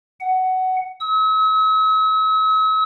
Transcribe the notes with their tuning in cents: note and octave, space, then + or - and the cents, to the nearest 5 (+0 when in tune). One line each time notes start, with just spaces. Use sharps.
F#5 +15
E6 -45